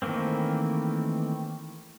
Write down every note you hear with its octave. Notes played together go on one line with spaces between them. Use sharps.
D#3 E3 A3 A#3 C4